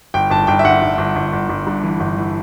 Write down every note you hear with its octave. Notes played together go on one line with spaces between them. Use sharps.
G1 G5
G1 A5
G1 G5
E5
G1 F#5
G1
G1
G1
G1
G1
G2
E3
G1
E3